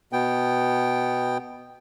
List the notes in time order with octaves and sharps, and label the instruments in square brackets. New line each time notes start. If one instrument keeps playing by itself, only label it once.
[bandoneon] B2 B3 G5